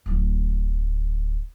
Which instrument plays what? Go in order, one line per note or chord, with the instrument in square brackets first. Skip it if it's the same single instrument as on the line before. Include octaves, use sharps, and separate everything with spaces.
[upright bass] D1 F#3